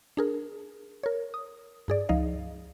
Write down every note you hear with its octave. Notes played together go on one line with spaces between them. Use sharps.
D4 G#4 A#4
A#4 C#5
D#6
G2 G#4 D5
C#2 F3 D#4 D#5 F5